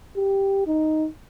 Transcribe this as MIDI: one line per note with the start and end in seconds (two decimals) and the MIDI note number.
0.16 0.62 67
0.67 1.07 63